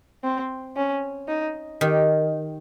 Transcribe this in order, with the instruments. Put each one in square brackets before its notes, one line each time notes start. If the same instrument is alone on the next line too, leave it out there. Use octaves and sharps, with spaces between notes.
[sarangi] C4
C#4
D#4
[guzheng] D#3 [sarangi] G4